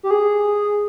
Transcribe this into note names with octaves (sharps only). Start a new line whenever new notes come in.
G4
G#4